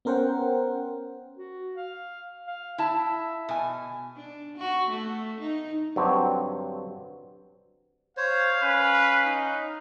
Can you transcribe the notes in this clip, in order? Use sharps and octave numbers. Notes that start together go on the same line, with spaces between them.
B3 C#4 A#4 C5 F#5 G5
F#4
F5
F5
E4 E5 A5
B2 G#5
D4
F#4
A3
D#4
G2 D3 F#3 C4
C5 C#5 F5
C#4 B4
D#4